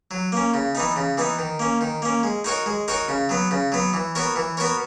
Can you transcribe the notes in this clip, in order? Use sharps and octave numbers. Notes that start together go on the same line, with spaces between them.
F#3
A#3 C#4
C#3
E3 B3 D#4
C#3
E3 B3 D#4
D#3
A#3 C#4
D#3
A#3 C#4
G#3
D#4 F#4 A#4 C#5
G#3
D#4 F#4 A#4 C#5
C#3
F#3 B3
C#3
F#3 B3
E3
B3 F#4 A#4 C#5
E3
B3 F#4 A#4 C#5